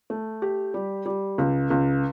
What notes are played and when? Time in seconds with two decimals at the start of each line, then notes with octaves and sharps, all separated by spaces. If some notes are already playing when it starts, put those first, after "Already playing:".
0.10 A3
0.42 G4
0.74 G3
1.06 G3
1.38 C#2
1.70 C#2